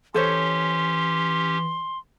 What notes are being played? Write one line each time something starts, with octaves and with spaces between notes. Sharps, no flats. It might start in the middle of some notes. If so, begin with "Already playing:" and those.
E3 C#4 G4 A4 C5 C#5 C6